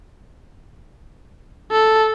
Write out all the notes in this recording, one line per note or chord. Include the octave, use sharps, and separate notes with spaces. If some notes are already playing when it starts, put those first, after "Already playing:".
A4